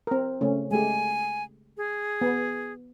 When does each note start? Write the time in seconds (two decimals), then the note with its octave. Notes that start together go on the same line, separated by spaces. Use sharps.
0.07 C4 A#4
0.41 C#3 A3 C#4
0.71 G#3 A3 G4 G#5
1.77 G#4
2.21 B3